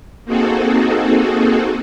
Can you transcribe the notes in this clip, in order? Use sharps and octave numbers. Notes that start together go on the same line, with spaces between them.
A#3 C4 D#4 F#4 G#4 A4